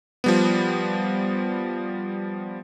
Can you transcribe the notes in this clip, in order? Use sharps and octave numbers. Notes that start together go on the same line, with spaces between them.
F3 G3 B3